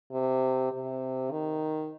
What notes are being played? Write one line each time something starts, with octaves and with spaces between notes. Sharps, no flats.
C3
C3
D#3